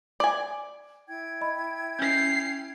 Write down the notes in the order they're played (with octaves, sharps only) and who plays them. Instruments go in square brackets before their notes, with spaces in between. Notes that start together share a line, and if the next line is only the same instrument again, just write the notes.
[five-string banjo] D5 G#5
[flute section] E4 G5 G#6
[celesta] D#5 B5
[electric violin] C#4 C7 [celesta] G6